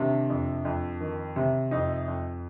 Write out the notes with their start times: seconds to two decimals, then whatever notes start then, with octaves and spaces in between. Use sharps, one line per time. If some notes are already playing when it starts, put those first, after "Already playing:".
Already playing: C3 D#3 D4
0.30 F2
0.65 F2
1.01 D#3
1.36 C3
1.71 F2 D#4
2.08 F2